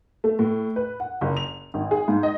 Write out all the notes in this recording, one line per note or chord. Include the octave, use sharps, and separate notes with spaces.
A3
A2
B4
F#5
F#1
F7
G#1
G#4
G#2
D#5